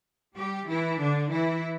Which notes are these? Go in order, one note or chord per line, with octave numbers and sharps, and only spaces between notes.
G3 G4
E3 E4
D3 D4
E3 E4